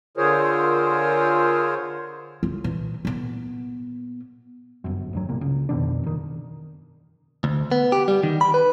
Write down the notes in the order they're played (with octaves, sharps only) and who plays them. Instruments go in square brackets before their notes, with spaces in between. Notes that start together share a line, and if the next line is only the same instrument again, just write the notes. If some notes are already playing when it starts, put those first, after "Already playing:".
[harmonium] D3 F4 G#4 A#4 C5 C#5
[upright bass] C#2 F4
A#2 E3
A#2 B3
[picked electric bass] G1 F#2
D2 G2 F#3
G1 C2 A#2
C#2
F2 B2 D#3 D4
F#1 D#3
[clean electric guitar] D2
B3
G4
G3
D#3
B5
B4